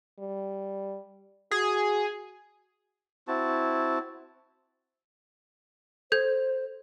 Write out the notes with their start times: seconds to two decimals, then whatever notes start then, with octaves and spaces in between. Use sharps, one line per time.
0.19 G3
1.51 F#4 G#4
3.28 C4 E4 F#4 A5
6.12 A4 C5 G6 G#6